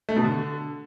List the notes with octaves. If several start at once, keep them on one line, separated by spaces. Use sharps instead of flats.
A3
B2
D3